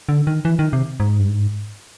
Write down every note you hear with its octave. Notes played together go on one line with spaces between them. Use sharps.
D3
D#3
E3
D#3
C3
G#2
G2
G#2